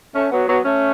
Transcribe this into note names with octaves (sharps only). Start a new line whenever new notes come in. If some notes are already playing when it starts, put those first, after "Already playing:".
A3 C#4
F#3 B3
F#3 B3
A3 C#4